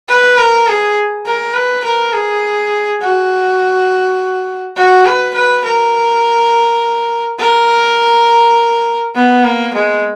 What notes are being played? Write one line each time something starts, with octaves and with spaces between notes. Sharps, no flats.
B4
A#4
G#4
A#4
B4
A#4
G#4
F#4
F#4
B4
B4
A#4
A#4
B3
A#3
G#3